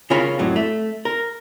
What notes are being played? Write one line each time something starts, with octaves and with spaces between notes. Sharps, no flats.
C#3 C#4 F4 A#4 C#5 B5
F2 A2 F#3
A3
A#4